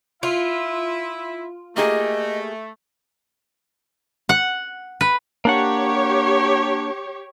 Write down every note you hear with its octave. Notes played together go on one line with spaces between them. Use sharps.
E4 F4 E5
A3 A#3 G4 G#4 D#5
F#5
B4
A#3 D4 G4 C#5 F#5